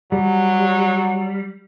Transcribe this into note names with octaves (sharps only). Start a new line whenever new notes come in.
F#3 G3